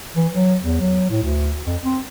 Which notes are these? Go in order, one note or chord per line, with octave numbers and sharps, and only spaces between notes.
E3
F#3
E2
F#3
A2
D2
F2
C4